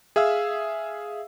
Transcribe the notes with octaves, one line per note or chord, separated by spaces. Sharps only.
G#4 E5 F5 E6